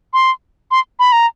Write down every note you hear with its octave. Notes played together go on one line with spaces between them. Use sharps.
C6
C6
B5
A#5